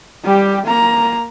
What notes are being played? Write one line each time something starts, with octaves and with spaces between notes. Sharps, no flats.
G3 G4
A#3 A#5